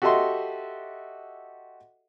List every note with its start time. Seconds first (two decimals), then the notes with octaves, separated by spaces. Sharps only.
0.02 F#4 G4 A4 D#5 E5 C6